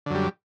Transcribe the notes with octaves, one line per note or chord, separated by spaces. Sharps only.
F#2 D3 G3